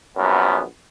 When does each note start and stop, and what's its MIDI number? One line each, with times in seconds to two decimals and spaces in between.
0.17 0.61 34
0.17 0.61 42
0.17 0.61 59